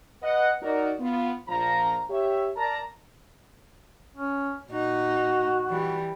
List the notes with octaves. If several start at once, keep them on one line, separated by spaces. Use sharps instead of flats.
B4 D#5 F#5
D#4 F#4 A#4 D5
B3 F4
A#1 F3 A#5
G4 C#5 E5
A#4 D5 A5 A#5
C#4
A#2 D#4 F#4
E3 G3